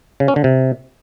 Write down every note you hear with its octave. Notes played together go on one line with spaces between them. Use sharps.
C#3
C#4
D3
C3